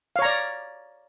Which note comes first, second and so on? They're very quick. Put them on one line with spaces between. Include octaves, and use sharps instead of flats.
F5 C#5 A#5 D5